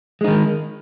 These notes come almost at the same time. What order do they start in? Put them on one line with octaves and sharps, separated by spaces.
G#3 D#4 D#3